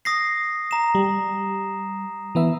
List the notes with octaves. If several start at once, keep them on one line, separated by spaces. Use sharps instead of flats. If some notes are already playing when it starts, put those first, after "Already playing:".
D#6 A#6 C7
A#5 E7
G3
E3 B3 E5